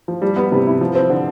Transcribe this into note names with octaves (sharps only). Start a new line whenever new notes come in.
F3
G3
B3
C3
E4
F3
C4
D3